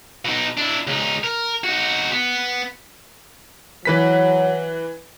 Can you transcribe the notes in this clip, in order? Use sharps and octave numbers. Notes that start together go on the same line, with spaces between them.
B2 D#4
D4 E4
C#2 D#4
A#4
D#4 F#4
B3
E3 F#3 B4 B6